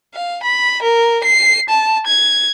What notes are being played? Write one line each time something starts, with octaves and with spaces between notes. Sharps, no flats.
F5
B5
A#4
C7
A5
G#6